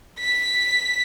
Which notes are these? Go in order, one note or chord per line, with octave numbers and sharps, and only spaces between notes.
B6